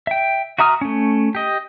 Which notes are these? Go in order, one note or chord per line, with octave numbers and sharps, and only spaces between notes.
E5 G5
F#4 E5 A#5 D#6 F6
A3 C#4
G4 D#5